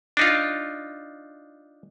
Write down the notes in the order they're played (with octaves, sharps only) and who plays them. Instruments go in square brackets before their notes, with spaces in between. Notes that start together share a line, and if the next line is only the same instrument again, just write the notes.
[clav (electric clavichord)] D4 D#4 F4